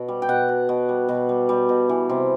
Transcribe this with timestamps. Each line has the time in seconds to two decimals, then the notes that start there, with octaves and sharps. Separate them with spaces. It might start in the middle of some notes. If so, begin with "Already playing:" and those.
Already playing: B2
0.08 G3
0.22 G5
0.29 B2 F#5
0.49 B2
0.69 B2
0.89 G3
1.09 B2
1.29 G3
1.49 G3
1.69 B2
1.89 E3
2.09 C3